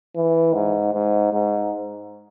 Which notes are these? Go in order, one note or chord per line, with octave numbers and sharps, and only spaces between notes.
E3
G#2
G#2
G#2